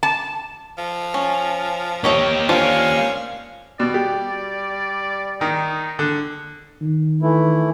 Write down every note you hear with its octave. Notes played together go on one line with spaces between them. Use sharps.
A5
F3
C#4
A#3 G4 C#5 D#5 E5
C#4 D4 F4 C5 F5
B2 G3 D5
G4
D#3 D#4
D3
D#3
E3 A3 E4